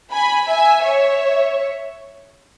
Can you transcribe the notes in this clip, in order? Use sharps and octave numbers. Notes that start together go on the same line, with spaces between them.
G#5 B5
E5 G#5
C#5 E5